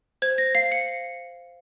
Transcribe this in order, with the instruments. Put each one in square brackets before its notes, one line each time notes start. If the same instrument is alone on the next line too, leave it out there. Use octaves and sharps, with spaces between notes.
[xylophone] C5 G#6
A#6
F5 C7
C#7